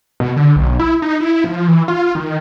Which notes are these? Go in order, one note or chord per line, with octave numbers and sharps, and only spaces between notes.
B2
D3
B1
E4
D#4
E4
F3
E3
F4
D#3